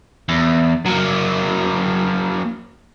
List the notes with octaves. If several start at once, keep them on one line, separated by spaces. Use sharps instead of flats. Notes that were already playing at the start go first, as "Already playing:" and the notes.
E2
F#3 A#3